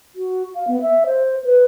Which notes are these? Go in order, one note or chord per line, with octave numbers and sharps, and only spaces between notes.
F#4
F5
B3
E5
C5
B4